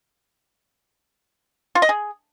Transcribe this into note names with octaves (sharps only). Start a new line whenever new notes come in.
F4
D#5
G#4